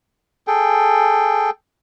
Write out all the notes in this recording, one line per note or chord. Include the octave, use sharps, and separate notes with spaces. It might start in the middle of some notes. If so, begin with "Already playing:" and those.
G#4 A4 G5